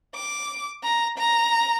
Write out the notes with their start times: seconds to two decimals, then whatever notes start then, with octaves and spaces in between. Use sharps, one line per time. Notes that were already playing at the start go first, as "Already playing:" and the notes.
0.15 D6
0.83 A#5
1.18 A#5